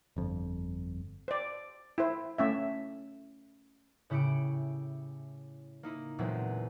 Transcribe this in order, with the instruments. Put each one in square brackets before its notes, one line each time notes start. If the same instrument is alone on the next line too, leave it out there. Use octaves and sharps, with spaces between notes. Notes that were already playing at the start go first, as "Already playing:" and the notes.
[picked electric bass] G1 F2
[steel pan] C5 D5
E4 C5
A3 C#4 E5
[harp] A2 C#3 E4 G4 C#7 D7
A#3 D#4 E4
E2 A#2 F#3 G#3 A3 C4